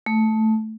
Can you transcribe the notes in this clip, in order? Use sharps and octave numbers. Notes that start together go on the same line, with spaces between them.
A3